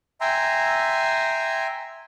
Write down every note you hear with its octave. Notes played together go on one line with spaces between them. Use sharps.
E5 G5 G#5 A#5 C6